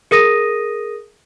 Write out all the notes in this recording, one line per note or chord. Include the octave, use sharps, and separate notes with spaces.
G#4 A#4 D#6 A#6 D#7